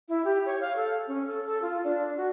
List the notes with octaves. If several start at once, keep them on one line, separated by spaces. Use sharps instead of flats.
E4
G4
C#5
F5
A4
C#4
A4
A4
F4
D4
F#4